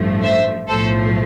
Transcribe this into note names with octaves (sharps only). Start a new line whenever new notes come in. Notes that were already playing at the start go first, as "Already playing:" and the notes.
Already playing: A1 G2 F3 A3
C5 E5
B1 A2 F3 A3 A4 C5